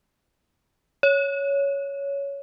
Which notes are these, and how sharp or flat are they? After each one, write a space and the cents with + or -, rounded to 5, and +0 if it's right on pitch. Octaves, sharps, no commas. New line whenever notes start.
C#5 +10